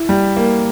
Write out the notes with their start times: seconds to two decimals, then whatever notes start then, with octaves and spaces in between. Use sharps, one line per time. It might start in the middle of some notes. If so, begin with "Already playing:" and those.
Already playing: E4
0.09 G3
0.37 A#3